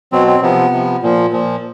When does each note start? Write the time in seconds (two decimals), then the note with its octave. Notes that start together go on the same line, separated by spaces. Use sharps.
0.12 B2 F#3 C4
0.27 C4
0.42 C3 F3 B3
0.72 C3 F3
1.03 A#2 F3
1.32 A#2 F3